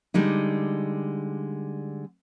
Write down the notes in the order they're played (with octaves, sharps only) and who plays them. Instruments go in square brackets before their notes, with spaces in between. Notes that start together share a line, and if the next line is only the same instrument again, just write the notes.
[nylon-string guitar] D3 G3 G#3 D#4